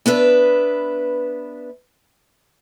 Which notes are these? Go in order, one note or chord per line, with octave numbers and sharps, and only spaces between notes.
B3 D4 B4 E5